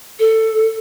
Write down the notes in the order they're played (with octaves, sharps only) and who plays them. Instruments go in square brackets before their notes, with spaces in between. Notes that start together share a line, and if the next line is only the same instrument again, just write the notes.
[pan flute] A4